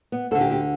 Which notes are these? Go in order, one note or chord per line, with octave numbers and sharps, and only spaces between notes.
B3
D2 D3 A4
G4
G4